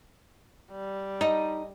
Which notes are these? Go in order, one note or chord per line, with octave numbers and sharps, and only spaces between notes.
G3
D#4 A4 D#5 A#5